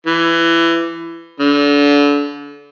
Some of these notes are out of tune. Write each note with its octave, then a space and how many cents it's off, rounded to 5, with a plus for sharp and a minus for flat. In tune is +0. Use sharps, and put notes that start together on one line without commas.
E3 +20
D3 -30